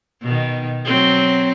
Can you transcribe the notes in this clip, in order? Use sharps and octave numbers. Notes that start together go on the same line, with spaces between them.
B2 D#3
F#3 C4